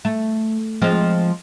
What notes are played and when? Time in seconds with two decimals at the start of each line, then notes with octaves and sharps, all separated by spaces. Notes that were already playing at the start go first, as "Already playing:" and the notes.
0.05 A3
0.82 F3 G#3 C4